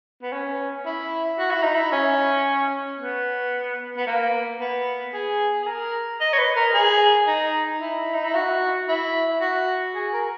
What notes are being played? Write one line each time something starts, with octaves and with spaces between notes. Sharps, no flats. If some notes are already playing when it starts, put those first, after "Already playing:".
B3
C#4
E4
F#4
E4
D#4
E4
C#4
B3
B3
A#3
B3
G#4
G#4
A#4
D#5
C#5
B4
A#4
G#4
D#4
E4
D#4
E4
F#4
E4
F#4
G#4
A#4